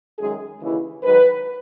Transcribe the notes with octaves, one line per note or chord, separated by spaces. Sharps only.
F#2 D#3 G#3 G#4
D#2 C#3 E3
G#2 D#3 F#3 B4